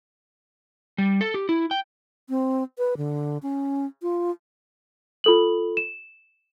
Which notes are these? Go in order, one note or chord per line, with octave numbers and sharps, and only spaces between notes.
G3
A4
G4
E4
G5
C4
B4
D3
C#4
F4
F4 A4 F#7
E7